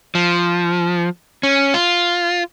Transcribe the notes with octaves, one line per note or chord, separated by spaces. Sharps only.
F3
C#4
F4